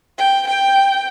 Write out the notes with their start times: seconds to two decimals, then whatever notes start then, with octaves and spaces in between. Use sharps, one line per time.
0.18 G5
0.47 G5